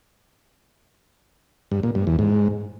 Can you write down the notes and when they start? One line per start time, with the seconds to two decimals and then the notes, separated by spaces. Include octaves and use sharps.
1.72 G2
1.83 A#2
1.95 G2
2.07 E2
2.19 G#2